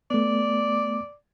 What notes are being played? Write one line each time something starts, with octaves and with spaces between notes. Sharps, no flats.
A3 B3 D5